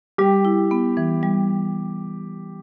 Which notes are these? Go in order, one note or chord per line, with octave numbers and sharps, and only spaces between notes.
G3 G4
E4
B3
E3
G3